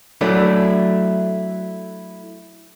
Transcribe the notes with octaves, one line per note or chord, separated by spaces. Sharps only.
F#3 A3 D4 E4